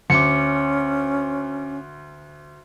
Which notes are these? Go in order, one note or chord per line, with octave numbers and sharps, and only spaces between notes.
D2 C#4 D6 C#7